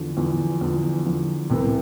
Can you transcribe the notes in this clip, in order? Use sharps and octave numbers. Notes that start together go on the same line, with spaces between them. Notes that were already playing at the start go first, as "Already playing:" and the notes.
Already playing: E2 D3 F3
E2 D3 F3
E2 D3 F3
E2 D3 F3
C2 C3 E3